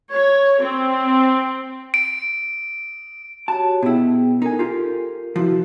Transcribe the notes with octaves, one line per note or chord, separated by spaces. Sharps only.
C#5
C4
D7
F#4 G4 C#5 A5
B2 B3 E4 G#4 G5
D#4 A4 A#4 G#5
F4 G4
C3 F3 E4 F#4